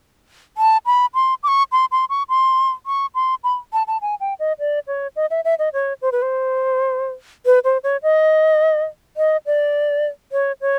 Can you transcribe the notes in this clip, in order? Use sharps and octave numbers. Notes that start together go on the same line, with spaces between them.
A5
B5
C6
D6
C#6
C6
C6
C#6
C6
C#6
C6
B5
A5
A5
G#5
G5
D#5
D5
C#5
D#5
E5
E5
D#5
C#5
C5
B4
C5
B4
C5
C#5
D#5
D#5
D5
C#5
C#5